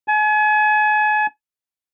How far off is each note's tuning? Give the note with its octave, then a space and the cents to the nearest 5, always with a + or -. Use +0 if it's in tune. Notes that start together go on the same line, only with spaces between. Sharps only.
G#5 +40